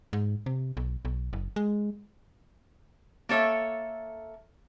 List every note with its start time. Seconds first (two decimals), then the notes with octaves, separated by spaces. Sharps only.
0.13 G#2
0.46 C3
0.77 B1
1.05 B1
1.33 F#1
1.56 G#3
3.29 A#3 A4 C#5 E5